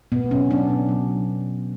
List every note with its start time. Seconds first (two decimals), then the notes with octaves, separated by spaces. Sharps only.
0.12 B2 B3
0.31 F#3 C#4
0.51 F#3 D4
0.69 B2
0.89 F#3